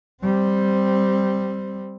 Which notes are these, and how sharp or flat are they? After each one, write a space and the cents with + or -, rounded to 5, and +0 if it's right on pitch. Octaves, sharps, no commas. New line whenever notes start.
G3 +0 C4 +0